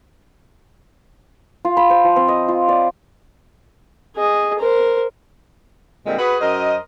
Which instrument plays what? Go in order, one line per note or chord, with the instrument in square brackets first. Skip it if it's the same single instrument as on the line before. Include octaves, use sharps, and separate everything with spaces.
[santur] F4
B5
C5
F3
C4
D#5
F4
D5
[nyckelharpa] G#4 D#5
A#4 C5
[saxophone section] A#2 D3 G3 G#3 C4
F#4 G#4 B4
F#2 A#4 C5 D#5